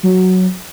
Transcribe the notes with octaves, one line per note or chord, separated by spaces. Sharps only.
F#3